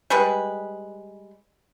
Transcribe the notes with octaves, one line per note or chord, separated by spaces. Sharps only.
G3 G#3 B4